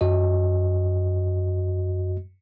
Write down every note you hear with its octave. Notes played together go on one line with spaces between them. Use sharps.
F#2 F#4 D#5